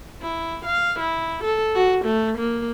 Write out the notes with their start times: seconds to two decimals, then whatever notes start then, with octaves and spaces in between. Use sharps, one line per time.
0.21 E4
0.65 F5
0.99 E4
1.43 A4
1.75 F#4
2.05 A3
2.38 A#3